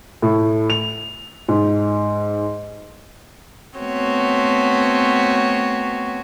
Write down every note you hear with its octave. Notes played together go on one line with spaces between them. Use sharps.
A2
F7
G#2
A3 B3 C4 F#4 C#5